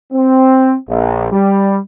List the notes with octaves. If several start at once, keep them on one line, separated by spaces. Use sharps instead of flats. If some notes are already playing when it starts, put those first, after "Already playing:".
C4
A#1
G3